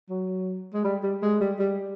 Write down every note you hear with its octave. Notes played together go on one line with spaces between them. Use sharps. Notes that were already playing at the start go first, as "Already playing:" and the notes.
F#3
G#3
G3
G3
G#3
G3
G3